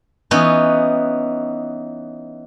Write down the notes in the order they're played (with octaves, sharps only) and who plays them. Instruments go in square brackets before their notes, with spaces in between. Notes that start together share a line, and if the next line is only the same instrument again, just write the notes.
[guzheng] E3 B3 C#4 D#4